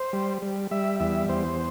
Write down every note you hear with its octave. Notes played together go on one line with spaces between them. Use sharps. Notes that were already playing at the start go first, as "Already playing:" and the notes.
Already playing: C5
G3
G3
G3 E5
E2 E5
E2 C5